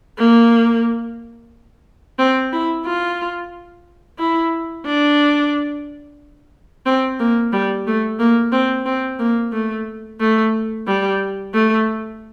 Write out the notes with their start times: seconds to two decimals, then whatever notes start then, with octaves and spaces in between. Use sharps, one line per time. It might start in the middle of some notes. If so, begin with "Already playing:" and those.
0.18 A#3
2.19 C4
2.53 E4
2.86 F4
4.19 E4
4.86 D4
6.86 C4
7.20 A#3
7.52 G3
7.87 A3
8.19 A#3
8.52 C4
8.86 C4
9.19 A#3
9.52 A3
10.20 A3
10.87 G3
11.54 A3